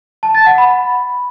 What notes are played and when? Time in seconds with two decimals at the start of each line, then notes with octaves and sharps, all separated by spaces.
0.23 A5
0.35 A6
0.46 F#5
0.58 B5